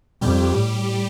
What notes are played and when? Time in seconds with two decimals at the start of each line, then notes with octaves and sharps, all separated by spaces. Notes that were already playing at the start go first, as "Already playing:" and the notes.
0.21 F2 G3 G4
0.55 A2